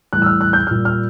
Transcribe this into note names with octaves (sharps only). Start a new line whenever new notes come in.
A2 E3 G3 F#6
E6
F6
F#6
G6
A#2 G3 F6
F6